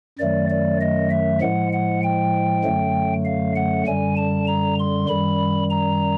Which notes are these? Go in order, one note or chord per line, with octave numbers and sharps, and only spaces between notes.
F#2 D#3 F#3 A3 D5
D5
D#5
E5
A2 F3 G#3 F#5
F#5
G5
F#2 D3 F#3 A3
F5
F#5
F#2 D3 G3 G#5
A5
A#5
C6
F#2 D#3 G3 B5
A#5